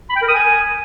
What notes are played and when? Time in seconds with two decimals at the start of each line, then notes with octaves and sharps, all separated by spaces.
0.09 B5
0.16 G5
0.22 A#4
0.28 D#6
0.35 G#5